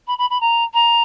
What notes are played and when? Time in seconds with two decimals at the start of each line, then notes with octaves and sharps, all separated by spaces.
0.07 B5
0.18 B5
0.30 B5
0.40 A#5
0.73 A#5